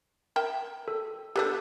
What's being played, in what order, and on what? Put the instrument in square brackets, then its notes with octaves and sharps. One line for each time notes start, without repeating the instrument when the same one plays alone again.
[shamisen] A#4 E5 G5
[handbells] A4
[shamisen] D3 B3 D4 [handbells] G4 A4 G6